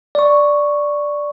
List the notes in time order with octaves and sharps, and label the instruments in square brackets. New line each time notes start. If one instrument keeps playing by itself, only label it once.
[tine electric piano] D5 C#6